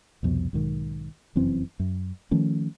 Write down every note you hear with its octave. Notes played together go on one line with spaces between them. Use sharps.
C2 F2 B2
B1 G#2 D#3
F1 F#2 E3 C4
F#2
D#3 F3 A3 C#4